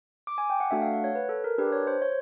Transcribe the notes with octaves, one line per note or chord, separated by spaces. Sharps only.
D6
G#5
G5
F#5
A3 D4 F#4 A4 E5
F5
F#5
C#5
B4
A4
A#4
D4 G4 B4
C#5
C5
C#5